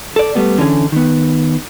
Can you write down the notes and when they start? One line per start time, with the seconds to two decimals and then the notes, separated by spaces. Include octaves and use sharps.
0.16 A4 D5
0.35 G3 A3 B3
0.58 D3 E3 C#4 G#4
0.92 D#3 B3